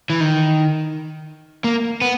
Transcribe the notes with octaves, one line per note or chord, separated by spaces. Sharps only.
E3
D#3
A#3
B3